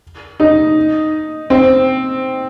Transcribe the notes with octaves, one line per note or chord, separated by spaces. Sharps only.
D#4
C4